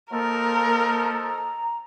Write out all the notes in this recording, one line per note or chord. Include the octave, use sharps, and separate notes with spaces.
F3 A#3 D#4 A4 A#4
A#5